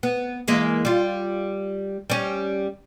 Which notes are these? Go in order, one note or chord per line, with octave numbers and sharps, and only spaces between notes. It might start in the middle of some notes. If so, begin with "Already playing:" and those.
B3
E3 G#3 A#3
G3 F4
G3 C#4